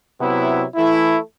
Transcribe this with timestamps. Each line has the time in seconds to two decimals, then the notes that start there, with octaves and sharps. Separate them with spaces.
0.20 C3 F#3 B3 E4
0.75 E3 A3 E4